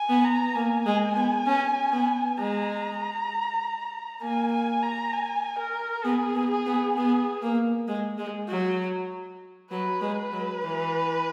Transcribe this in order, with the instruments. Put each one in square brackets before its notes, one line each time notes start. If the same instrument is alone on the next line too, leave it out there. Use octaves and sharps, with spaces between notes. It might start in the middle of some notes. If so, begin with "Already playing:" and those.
Already playing: [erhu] G#5
[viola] B3
[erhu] A#5
[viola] A#3 [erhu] G#5
[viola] G#3
B3
C#4
B3
[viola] G#3 [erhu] A#5
[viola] A#3 [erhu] G#5
[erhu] G#5
A#5
G#5
A#4
[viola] B3 [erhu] G#4
[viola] B3
[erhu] G#4
[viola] B3
[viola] B3 [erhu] G#4
[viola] A#3
G#3
G#3
F#3
[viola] F#3 [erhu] B4
[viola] G#3
[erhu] B4
[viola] F#3
E3